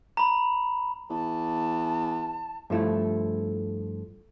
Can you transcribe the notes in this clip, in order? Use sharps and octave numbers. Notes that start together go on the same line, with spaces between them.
A#5 B5
E2 A5
G2 F3 A3 E4